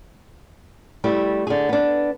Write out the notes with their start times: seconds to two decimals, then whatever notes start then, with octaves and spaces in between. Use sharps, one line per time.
1.04 G3 A3 E4 G4
1.47 D3 G#4
1.69 B3 D4